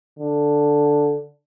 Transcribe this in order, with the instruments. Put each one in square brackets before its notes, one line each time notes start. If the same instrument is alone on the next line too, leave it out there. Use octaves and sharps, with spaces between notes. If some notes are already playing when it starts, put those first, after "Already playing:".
[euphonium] D3